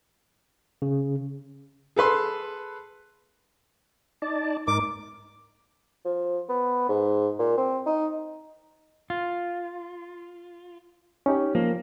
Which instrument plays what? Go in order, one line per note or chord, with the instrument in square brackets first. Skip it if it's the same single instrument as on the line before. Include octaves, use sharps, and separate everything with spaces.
[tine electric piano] C#3
[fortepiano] G#4 A4 B4 C6
[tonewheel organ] D#4 D5 A5
[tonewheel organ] G#2 D#4 A#4 [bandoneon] D6
[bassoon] F3
B3
G#2
A#2
C4
D#4
[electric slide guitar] F4
[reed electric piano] C#4 D#4 G4
[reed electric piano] F3 [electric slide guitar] A#3